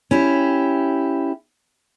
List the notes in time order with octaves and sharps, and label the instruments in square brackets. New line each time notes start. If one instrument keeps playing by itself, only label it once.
[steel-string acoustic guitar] C#4 E4 G4